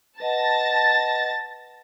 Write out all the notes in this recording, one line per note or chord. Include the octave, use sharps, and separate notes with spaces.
B4 D#5 F#5 A5 A6 A#6